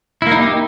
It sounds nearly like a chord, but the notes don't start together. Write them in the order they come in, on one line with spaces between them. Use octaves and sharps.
E4 A#3 D#4 G4